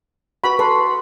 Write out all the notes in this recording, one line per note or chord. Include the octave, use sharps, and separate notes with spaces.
F#4 B4 B5
A4 B4 C6